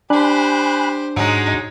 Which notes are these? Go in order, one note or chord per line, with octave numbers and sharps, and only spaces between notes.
D4 G4 C5 G#5 B5 F#6
G#2 F#3 G#3 D#4